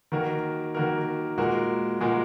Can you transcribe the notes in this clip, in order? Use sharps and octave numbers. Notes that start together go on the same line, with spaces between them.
D#3 A#3 F#4 A#4
D#3 A#3 F#4 A#4
A#2 G#3 F#4 A#4
A#2 G#3 F#4 A#4